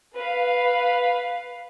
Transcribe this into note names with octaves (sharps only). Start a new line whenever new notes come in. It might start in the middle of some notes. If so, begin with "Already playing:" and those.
B4 F5